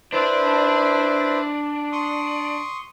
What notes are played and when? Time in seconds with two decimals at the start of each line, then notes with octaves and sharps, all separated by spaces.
0.12 D4 E4 B4 C5 D5
1.92 C6 C#6 D#6